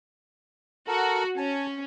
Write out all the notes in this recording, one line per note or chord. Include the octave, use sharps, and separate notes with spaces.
F#4 A4 A#4
C#4 G#5 A5